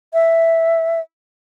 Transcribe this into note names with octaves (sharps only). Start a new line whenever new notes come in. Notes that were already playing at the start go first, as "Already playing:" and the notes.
E5